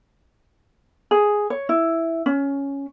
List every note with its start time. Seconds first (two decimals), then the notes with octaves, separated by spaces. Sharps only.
1.11 G#4
1.50 C#5
1.69 E4
2.26 C#4